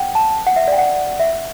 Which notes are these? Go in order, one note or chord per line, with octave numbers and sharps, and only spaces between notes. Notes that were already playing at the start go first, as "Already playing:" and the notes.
Already playing: F#5 G5
A5
F#5
E5
D5 G5
F#5
E5